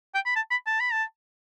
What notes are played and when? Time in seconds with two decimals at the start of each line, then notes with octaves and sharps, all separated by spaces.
0.14 G5
0.26 B5
0.36 A5
0.51 B5
0.67 A5
0.80 B5
0.92 A5